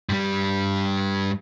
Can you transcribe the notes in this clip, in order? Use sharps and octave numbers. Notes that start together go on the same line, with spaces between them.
G2 G3